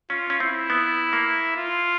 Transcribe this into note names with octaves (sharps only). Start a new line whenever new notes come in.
C#4 F4
C#4
C4 E4
B3
A#3
F4